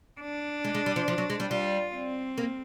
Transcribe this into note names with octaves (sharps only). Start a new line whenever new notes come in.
D4
G#3
G#3
G3
F3
F3
F#3
G#3
G3
G3 F4
C4
A#3